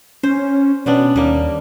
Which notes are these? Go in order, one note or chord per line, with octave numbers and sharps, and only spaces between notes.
C#4 C5
B2 G3 B3 C#4 D4
D#2 G3 A#3